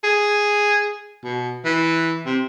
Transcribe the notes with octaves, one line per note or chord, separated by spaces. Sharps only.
G#4
B2
E3
C3